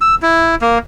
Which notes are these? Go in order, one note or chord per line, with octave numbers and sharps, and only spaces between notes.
E6
E4
A#3